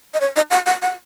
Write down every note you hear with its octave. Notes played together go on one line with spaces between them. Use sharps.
D#5
C#5
D#5
F#5
F#5
F#5